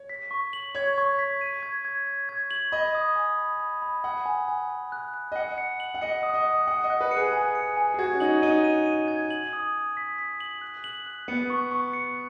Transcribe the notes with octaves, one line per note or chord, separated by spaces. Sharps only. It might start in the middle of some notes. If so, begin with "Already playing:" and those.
Already playing: C#5
B6
C#6
F#7
C#5 G#6
C#6
B6
D#7
G#6
G#6
G#6
G#6
F#7
D#5 B5
D#6
G#5
B5
B5
B5
F#5 B5
G#5
G#5
G#5
F#6
F#6
D#5
F#5 C#7
C#7
F#7
F#5
D#5 C#7
D#6
D#5
D#6
F#5 C#7
D#5
F#6
B4
C#7
G#4
G#5
C#7
G#5
G#4
F#4 G#6
C#4
D#4 F#7
D#4 D#7
D#7
D#7
G#6
F#7
D#6
D#6
B6
B6
F#7
F#6
F#7
F#6
B3 C#7
C#6
C#6
C#7